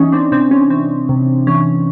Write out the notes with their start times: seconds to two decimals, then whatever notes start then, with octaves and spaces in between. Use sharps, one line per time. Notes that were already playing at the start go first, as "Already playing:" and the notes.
Already playing: E3 C#4 D#4
0.12 C4 D4
0.32 C3 C4 D4
0.51 C#4
0.70 E3 C4
1.09 C3
1.47 E3 C#4